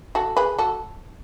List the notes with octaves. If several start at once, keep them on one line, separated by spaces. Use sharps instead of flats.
F#4 A4
G#4 B4
F#4 A4